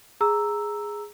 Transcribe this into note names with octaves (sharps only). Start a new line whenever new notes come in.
G#4 A#5 E6